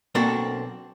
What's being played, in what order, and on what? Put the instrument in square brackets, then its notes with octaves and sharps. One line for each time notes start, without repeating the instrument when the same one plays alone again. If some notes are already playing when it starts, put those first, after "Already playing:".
[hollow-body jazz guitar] B1 A#3 C4 D4 F#4 A4